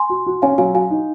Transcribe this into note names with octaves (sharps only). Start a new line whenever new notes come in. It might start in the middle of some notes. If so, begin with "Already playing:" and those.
Already playing: G#5 C6
F#4
F#4
C#4 F5 G#5
F#3 F5 G#5
F#4 F5 G#5
D#4